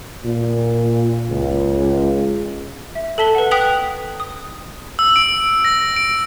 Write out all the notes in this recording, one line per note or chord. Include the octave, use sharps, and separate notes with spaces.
A#2
C#2
E5
A4 A5 B6 G7
B4 F#5
G5 D#6 F#6 B6 F7 F#7
D#6
E6
D7
A#6
D7